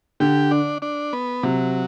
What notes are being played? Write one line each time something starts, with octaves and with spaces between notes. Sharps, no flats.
D3 G4
D4
D4
B3
C3 F#3